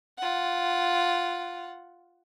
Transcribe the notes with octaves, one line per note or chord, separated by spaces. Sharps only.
F4 F#5